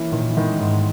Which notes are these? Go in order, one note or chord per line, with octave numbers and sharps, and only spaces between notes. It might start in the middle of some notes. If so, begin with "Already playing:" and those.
Already playing: E3 A#3 C#4 E4
A#2 D#3
E3
D#3 G#3 B3
G#2